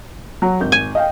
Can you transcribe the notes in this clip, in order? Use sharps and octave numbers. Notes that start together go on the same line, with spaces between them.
F#3
G#1 G6
G#5
D#5 F5 G5